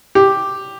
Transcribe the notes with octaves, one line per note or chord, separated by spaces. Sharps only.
G4